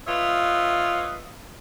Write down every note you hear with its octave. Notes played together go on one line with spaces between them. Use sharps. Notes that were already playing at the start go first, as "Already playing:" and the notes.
B3 F4 B4 C#5 D#5 E5